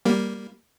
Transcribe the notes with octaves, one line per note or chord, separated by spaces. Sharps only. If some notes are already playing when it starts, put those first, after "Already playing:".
G3 A#3